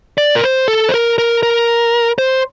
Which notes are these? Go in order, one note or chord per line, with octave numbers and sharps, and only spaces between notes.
D5
A#4
C5
A4
C5
A#4
A#4
A#4
C5